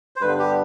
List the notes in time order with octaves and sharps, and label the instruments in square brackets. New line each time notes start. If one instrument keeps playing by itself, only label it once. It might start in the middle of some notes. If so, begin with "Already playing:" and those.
[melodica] C5
[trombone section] G2 D3 G3 B3 [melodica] B4
[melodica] G4